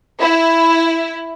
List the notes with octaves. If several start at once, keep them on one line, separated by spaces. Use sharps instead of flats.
E4